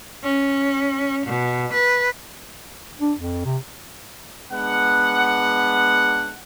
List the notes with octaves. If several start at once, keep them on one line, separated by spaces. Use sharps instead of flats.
C#4
B2
B4
D4
F2
C3
G#3 B3 D4 F#5